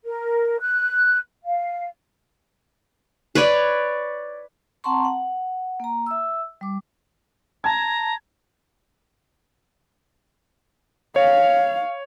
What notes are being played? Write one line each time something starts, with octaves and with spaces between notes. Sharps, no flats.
A#4
F#6
F5
B4 C#5 D5
C4 F#5 A5 A#5 C6 C#6
F#5
A#3 A#5
E5 E6
G3 D6
A5 A#5 G#6
C#5 F5